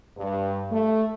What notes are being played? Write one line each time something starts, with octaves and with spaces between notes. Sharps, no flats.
G2
A3